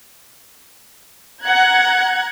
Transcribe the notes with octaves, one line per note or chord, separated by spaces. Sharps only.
F#5 A#5 F#6 G#6